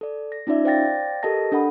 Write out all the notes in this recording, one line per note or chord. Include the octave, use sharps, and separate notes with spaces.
A4 D5
A#6
C#4 D#4 F4 D5 E5
C5 D5 F5 G5 A6 A#6
G4 A4 A#4 D#5 A5 A#6
D4 A4 F#5 B5